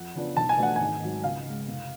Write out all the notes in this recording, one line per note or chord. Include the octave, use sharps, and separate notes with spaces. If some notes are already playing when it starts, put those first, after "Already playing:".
Already playing: F2 F#5
C#3 F3 B3 D4
B1 A5
G#5
B2 A3 D4 F#5
G#1 G#5
G#2 F#3
C#2 F5
C#3 G#3
F1